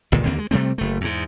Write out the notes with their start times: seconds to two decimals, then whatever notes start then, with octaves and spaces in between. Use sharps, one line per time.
0.12 G1 C#2 A#2 D#3
0.25 D#2 D3 A#3 C4
0.39 G#3
0.51 C3 G3 A3 C4
0.78 F#1 A3
1.01 E2 G#2